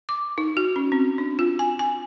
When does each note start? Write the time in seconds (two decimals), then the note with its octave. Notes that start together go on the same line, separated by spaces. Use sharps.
0.09 D6
0.38 D#4
0.57 F#4
0.76 C#4
0.92 C4
1.18 D4
1.39 F4
1.59 G#5
1.79 G#5